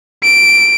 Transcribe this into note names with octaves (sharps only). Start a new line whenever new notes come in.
D7